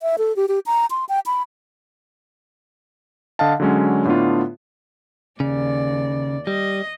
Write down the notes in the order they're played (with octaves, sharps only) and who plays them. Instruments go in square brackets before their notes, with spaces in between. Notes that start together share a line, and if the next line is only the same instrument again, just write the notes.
[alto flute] E5
A4
G4
G4
A#5
C6
G5
B5
[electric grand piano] D3 D#5 F5 A5
D3 F#3 G#3 C#4
A2 D3 B3 D4 F4
[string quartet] D#2 D5 [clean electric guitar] C#3
[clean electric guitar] G3 [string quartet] D#5